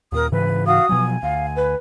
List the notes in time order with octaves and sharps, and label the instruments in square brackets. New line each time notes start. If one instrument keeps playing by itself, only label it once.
[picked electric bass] D#2 A#2 [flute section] A#4 D#6
[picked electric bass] G#2 C#3 E3 [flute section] B4
[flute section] F#4 F5 [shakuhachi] D#6
[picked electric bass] B2 F3 F#3 [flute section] G#5
[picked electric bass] D2 [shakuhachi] F5
[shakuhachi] B4